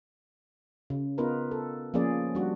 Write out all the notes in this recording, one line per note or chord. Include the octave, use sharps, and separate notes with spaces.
C#3
B3 D#4 F4 A#4 B4
A4
F3 A#3 C#4 G#4 D5
G3 D4 F#4